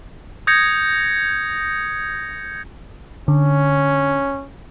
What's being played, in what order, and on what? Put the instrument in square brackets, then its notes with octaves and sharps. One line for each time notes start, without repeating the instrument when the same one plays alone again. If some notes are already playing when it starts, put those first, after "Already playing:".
[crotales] D#6 G6 G#6 A#6 C#7
[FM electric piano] D3 [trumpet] C#4